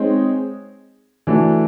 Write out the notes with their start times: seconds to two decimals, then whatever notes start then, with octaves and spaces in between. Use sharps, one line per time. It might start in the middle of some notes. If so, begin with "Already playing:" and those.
Already playing: G#3 C4 D#4 G#4 C#5
1.27 E3 A3 D4 F#4